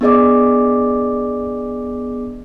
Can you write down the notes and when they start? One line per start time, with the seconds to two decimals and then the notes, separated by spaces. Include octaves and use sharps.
0.01 B3 D4 G#4 D5 D#5 D6